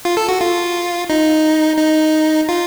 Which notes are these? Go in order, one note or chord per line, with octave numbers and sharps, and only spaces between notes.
F4
A4
F#4
F4
D#4
D#4
F4